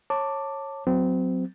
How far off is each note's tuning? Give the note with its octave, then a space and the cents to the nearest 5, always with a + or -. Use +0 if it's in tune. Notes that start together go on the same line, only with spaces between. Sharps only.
C#5 -20 A5 +15 D6 +0
F#3 +0 C4 -25